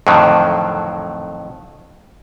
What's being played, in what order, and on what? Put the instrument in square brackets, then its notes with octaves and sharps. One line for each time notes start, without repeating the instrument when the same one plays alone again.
[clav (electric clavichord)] F2 A2 D3 D#3 F#3